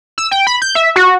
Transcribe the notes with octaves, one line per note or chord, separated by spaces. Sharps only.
E6
G5
B5
G6
E5
F#4